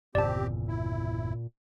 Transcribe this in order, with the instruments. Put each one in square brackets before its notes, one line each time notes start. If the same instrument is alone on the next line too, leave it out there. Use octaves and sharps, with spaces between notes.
[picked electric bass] G1 E2 C#3 [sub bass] A#2 [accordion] C4 G4 [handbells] D5 A5
[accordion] E4